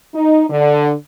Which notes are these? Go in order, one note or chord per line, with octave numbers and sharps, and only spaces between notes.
D#4
D3